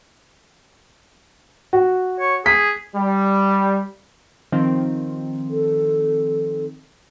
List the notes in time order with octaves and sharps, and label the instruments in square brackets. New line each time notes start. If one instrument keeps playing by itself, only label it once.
[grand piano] F#4
[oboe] C#5
[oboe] G#4 [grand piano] B6
[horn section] G3
[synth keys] D#3 F3 C4
[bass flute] A4